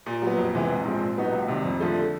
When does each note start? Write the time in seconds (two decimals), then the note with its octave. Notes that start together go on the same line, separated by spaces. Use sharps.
0.06 A#2
0.22 F#3 B3
0.38 F2
0.53 C3 E3 G#3 B3
0.69 A#1
0.84 G#2 F3 G#3 C4
1.01 A#2
1.17 F#3 B3 D#4 F#4
1.32 C#2
1.48 C3 D#3 G3
1.65 F2
1.80 D3 F3 A3